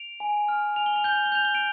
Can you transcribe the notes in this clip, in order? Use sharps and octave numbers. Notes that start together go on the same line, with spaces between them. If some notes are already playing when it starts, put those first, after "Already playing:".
Already playing: D7 F7
G#5
F6
G#5 F7
G7
F7
G6 G7
F7
G7
G6 F7
G7
D7 F7